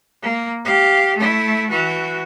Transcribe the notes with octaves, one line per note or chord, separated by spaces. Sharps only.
A#3
G4 F5
A3 E4
E3 F#4